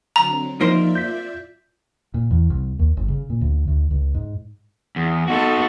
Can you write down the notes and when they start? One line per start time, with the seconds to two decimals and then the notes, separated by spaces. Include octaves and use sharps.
0.16 D3 F#3 C4 A#5
0.61 F3 A#3 D#4 F4 A#4 C5 D5 E5
0.95 G6 B6
2.14 A#2
2.31 E2
2.50 C2
2.79 D#2
2.97 G1
3.08 C#3
3.30 A#2
3.41 D2
3.68 D2
3.91 C#2
4.14 G#2
4.96 E2
5.28 B3 D#4 F#4 A4